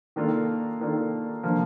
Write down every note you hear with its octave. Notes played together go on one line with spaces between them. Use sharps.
D#3 A#3 D4 F4 A4
D#3 A#3 D4 F4 A4
D3 F3 A#3